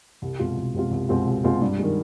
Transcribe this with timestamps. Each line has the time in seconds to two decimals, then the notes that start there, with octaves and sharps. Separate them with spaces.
0.22 C2
0.39 B2 G#3 C4 F4
0.57 C2
0.74 B2 G#3 C4 F4
0.91 C2
1.09 B2 G#3 C4 F4
1.26 C2
1.44 B2 G#3 C4 F4
1.62 G2
1.79 D#3 G#3